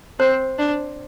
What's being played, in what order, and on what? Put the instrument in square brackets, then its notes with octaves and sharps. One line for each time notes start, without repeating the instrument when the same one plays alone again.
[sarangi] C4 [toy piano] C5
[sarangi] D4